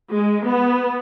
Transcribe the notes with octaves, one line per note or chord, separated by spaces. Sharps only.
G#3
B3